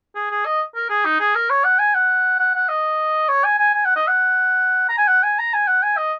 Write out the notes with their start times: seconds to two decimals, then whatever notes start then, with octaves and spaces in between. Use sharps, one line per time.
0.15 G#4
0.31 G#4
0.45 D#5
0.75 A#4
0.89 G#4
1.05 D#4
1.20 G#4
1.35 A#4
1.50 C#5
1.64 F#5
1.79 G#5
1.95 F#5
2.39 F#5
2.55 F#5
2.69 D#5
3.29 C#5
3.44 G#5
3.59 G#5
3.74 G#5
3.85 F#5
3.96 D#5
4.07 F#5
4.89 A#5
4.98 G#5
5.08 F#5
5.23 G#5
5.39 A#5
5.54 G#5
5.67 F#5
5.83 G#5
5.97 D#5